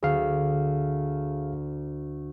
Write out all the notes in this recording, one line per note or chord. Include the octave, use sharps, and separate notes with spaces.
D2 G#4 F5